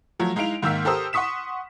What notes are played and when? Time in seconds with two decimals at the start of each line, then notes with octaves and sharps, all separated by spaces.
0.19 F3 F#3 A3
0.36 G#3 D#4 E4 F5 D7 F7
0.62 G#2 D#3 A#3 E6 F6 B6
0.85 G4 A4 A#4 C5 D#6 E6
1.13 F#5 C6 C#6 D#6 B6 E7